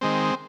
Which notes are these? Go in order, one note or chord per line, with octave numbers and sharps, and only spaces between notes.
D#3 G#3 C4